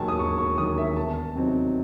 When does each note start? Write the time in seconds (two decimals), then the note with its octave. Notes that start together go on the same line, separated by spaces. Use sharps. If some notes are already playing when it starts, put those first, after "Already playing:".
Already playing: E1 D#2 D#3 F#3 G#5 A5
0.08 D#6
0.19 E1 C#6
0.38 C#6
0.58 D#2 D#3 F#3 D#6
0.78 E5
0.96 E2 A5
1.35 C3 F#3 C4 D#4